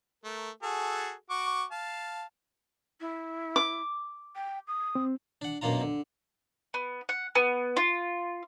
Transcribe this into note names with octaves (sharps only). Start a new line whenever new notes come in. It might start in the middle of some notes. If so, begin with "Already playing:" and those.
A3 A#4
F#4 G#4 A4
F#4 C#6 D6
F5 A5
E4
D6
G5
D#6
C4
D4 F#5
F#2 B2 A#3 D4 F4 A#5
D3
B3
F#5
B3
F4